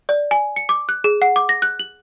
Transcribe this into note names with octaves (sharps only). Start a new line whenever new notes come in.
D5
G#5
C#7
D6
F#6
G#4
F#5
D6
A#6
F#6
F#7